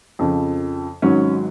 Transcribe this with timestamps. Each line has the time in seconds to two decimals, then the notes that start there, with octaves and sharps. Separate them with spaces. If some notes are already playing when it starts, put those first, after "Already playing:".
0.19 F2 C#3 F3
1.02 G#1 G#2 F#3 C#4